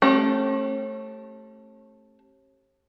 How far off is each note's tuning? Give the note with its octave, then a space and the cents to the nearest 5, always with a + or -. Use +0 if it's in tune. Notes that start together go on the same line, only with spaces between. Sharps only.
A3 +0 C#4 -40 G4 -15